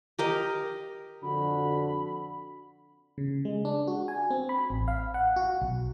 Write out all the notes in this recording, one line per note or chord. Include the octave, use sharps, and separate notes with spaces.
G4 A#4 D#5
F2 D3 F#4 B5
C#3
G#3
D4
F#4
G#5
C4
B5
A1
F5
F#5
F#4
B1